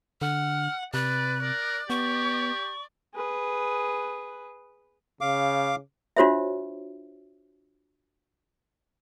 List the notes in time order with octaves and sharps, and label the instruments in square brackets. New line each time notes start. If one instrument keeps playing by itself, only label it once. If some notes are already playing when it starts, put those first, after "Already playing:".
[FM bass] D3 [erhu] F#5 [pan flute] F6
[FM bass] C3 [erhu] B4 [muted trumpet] D5 [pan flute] F#6
[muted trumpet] A#4 [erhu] D5
[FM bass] B3 [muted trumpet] G4 [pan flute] C#6
[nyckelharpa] G#4 B4
[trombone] C#3 [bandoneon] F5 D6
[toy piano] D4 F4 F#4 C5 C#5 E5